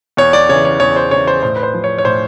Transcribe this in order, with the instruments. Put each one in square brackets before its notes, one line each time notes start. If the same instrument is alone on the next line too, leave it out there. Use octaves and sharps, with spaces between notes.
[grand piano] E2 C#5
D5
C#3 E3 C#5
C#5
E2 C#5
C5
C#3 E3 C#5
C5
A2 C5
B4
C5
F3
C#5
C#5
A2 C5